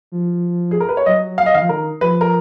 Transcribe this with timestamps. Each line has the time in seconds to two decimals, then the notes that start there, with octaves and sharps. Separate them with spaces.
0.12 F3
0.71 G#4
0.80 A#4
0.89 B4
0.97 C#5
1.06 F#3 D#5
1.38 F5
1.46 D#5
1.54 D#3 F5
1.62 F3
1.69 D#3 A#4
2.01 F3 B4
2.21 A#4